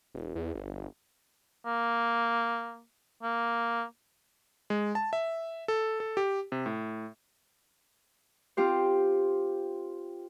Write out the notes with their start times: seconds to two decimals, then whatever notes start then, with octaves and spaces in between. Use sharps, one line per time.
0.15 E1
0.35 E2
0.55 G1
1.66 A#3
3.23 A#3
4.70 G#3
4.95 A5
5.13 E5
5.68 A4
6.00 A4
6.17 G4
6.52 C3
6.66 A2
8.57 C4 F4 G4 C5